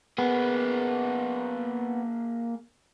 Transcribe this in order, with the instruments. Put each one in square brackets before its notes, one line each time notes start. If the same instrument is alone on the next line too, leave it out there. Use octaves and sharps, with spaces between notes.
[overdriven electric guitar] A#3 G#4 [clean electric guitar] B3